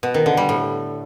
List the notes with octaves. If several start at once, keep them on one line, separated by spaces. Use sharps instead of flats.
B2
D#3
D3
G3
A2